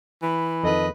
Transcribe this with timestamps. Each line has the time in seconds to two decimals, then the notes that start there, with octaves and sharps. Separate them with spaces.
0.22 E3 B5
0.64 F2 D#3 A4 B4 D#5